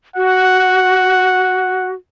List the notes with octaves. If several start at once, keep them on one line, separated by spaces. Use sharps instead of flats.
F#4 F#5